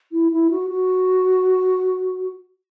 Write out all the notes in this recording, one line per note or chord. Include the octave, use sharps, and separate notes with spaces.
E4
E4
F#4
F#4